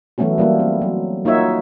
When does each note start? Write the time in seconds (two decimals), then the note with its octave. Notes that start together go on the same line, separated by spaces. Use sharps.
0.18 E3 F#3 A3 B3 C#4 F#4
0.38 G3 A#3 E4
0.59 C4
0.82 F#3
1.25 A#3 D#4 F4 F#4 C#5 E5